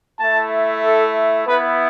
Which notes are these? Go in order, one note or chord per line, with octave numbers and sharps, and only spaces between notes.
A3 E4 A5
A4
B3 E4 B4